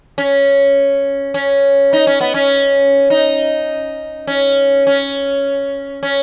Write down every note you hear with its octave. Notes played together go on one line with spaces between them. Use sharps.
C#4
C#4
D#4
C#4
B3
C#4
D#4
C#4
C#4
C#4